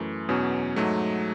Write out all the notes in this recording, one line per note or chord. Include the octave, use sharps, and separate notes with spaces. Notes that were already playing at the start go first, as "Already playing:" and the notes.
Already playing: F#2 E3 A3
E2 B2 F#3 C#4
G#2 F#3 A3 D#4